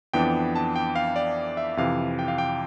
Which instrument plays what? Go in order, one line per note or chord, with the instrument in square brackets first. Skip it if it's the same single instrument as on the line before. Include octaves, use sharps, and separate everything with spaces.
[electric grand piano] F2 E3 B3 D4 G5
A5
G5
F5
D5
E5
F2 C3 E3 F5
G5
F5
G5